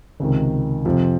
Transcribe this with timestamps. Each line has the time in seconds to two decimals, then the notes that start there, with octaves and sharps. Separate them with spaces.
0.20 C#2 C3 D#3
0.85 F2 C3 F3